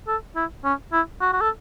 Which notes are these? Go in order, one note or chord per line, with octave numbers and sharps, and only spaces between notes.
A4
E4
C#4
E4
F#4
F#4
A4